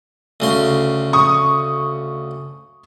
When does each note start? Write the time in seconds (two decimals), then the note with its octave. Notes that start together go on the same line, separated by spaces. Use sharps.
0.40 D2 C#3 C6
1.13 C#6 D#6